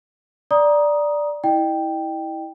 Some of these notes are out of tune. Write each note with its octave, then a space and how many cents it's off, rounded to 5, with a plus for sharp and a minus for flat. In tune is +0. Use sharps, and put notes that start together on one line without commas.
D5 +0 A#5 +20 D#6 +0
E4 -20 D#5 -30 G5 +0